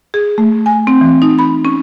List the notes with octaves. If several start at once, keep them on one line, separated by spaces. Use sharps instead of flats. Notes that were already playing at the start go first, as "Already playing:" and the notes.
G#4
A3
G#5
C4
E3
D#4
B5
C#4